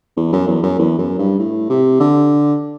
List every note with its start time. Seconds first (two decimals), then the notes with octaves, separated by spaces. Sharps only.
0.17 E2
0.33 F#2
0.47 E2
0.63 F#2
0.79 E2
0.98 F#2
1.18 G2
1.39 A2
1.70 C3
2.00 D3